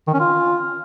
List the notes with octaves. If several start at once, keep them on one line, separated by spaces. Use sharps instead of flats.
D#3
C#4
F4